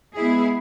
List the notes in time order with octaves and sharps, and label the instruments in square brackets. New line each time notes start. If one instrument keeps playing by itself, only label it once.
[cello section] G#3 B3 E4 G#4